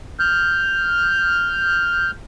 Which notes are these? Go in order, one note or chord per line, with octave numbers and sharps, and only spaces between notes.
F6 G6